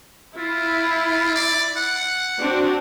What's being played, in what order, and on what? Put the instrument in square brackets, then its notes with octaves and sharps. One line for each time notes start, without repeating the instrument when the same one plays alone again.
[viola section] E4 [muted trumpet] F4
[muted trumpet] D5
F#5
[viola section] C4 D4 F#4